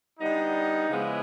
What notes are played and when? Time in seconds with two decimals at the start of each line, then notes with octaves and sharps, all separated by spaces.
0.19 D3 G3 B3 D#4
0.89 C#3 F3 G#3 B3 E4